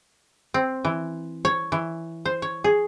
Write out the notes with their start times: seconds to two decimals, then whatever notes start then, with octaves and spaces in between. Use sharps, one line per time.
0.54 C4
0.85 E3
1.45 C#5
1.72 E3
2.26 C5
2.42 C#5
2.64 G#4